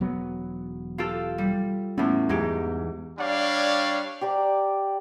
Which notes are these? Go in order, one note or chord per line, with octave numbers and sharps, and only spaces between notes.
E1 F#3 B3
F4 G4 A4
G3
E2 A2 C#4
E2 G#2 G#3 G4
G3 D4 C#5 D5 F5
G4 D5 A#5